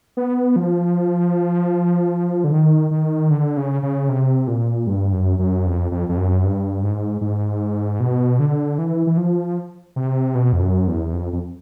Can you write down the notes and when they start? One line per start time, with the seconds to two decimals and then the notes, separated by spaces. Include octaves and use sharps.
0.17 B3
0.56 F3
2.44 D3
2.52 D#3
2.91 D#3
3.31 D3
3.57 C#3
3.83 C#3
4.09 C3
4.47 A#2
4.87 G2
5.13 F#2
5.39 F#2
5.66 F2
5.91 F2
6.09 F2
6.17 F#2
6.44 G2
6.83 G#2
7.21 G#2
8.00 B2
8.40 D3
8.78 E3
9.07 E3
9.17 F3
9.96 C3
10.35 B2
10.53 F2
10.61 F#2
10.87 E2
11.13 F2
11.33 F2